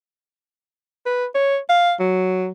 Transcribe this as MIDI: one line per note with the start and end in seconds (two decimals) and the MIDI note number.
1.06 1.26 71
1.35 1.58 73
1.70 1.94 77
2.00 2.50 54